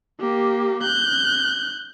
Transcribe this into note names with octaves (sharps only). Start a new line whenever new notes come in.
A#3 G4
F#6 G6